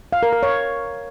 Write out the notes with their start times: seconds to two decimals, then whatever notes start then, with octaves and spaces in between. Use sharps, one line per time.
0.13 F5
0.23 A#4
0.33 A#4
0.43 C#5